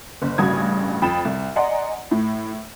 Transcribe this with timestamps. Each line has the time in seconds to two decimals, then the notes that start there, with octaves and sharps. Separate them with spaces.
0.22 F#1
0.38 A1 G2 C#3 F#4 D#6 G#6
1.02 F2 G5 B5 A6 E7
1.25 C2
1.56 D5 D#5 F#5 G#5 A#5 C6
2.11 A2